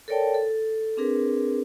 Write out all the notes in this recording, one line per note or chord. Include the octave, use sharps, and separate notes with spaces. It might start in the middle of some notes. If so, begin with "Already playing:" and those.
A4 A#4 C#5 D5 G5 A5
A4
C4 D4 G#4 A#4 B4